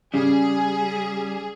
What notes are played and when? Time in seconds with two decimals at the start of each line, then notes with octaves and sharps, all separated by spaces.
0.14 C#3 G3 G#4